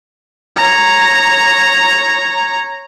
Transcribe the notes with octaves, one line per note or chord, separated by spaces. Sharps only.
C#5 A#5